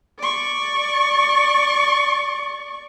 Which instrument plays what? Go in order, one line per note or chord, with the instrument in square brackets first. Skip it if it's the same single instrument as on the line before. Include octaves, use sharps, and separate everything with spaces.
[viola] D5 C#6